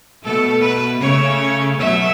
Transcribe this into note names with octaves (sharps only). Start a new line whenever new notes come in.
B2 A3 A4
B4
C#3 A3 C#5
B2 F#3 A3 E5